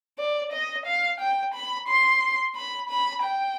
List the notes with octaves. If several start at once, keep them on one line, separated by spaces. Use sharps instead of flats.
D5
D#5
F5
G5
B5
C6
B5
B5
G5